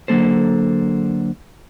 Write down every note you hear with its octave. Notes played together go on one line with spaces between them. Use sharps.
D3 F#3 A#3 A4 C5